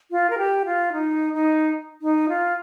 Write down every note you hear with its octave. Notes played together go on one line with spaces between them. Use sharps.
F4
A#4
G4
F4
D#4
D#4
D#4
F4